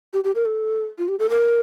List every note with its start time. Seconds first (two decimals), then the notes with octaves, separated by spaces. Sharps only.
0.13 G4
0.24 G4
0.35 A#4
0.45 A4
0.98 F4
1.08 G4
1.19 A4
1.30 A#4